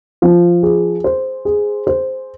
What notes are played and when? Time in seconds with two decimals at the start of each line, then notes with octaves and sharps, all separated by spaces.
0.22 F3
0.63 G#4
1.04 C5
1.45 G#4
1.87 C5